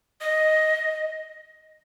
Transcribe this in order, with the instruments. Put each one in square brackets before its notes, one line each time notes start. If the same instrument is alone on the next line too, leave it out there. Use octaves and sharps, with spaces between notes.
[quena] D#5